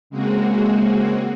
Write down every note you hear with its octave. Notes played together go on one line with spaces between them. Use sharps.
C#3 G#3 A#3 C4 F#4 G#4